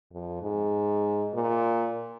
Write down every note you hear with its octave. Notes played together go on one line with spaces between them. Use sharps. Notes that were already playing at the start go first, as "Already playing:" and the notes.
F2
G#2
A#2